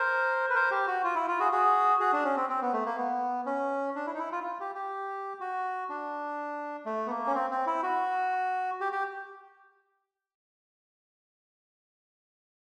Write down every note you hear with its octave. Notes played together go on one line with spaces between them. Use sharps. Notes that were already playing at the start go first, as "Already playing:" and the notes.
Already playing: A#4 C5
B4
A#4 C5
G4
F#4
F4
E4
F4
F#4 G#4
F#4 G#4
F#4 G#4
D4
C#4
C4
C4
B3
A3
A#3
B3
C#4
D4
E4
D#4
E4
F4
F4
G4
G4
F#4
D4
A3
B3
A#3
C#4
C4
C4
E4
F#4
G4
G4